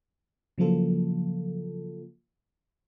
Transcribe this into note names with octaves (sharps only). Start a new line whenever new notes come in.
C#3 F3 F#3 A#3 F4 A4